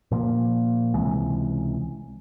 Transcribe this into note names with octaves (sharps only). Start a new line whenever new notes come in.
A#2 F3 A#3
C#2 C3 E3 G#3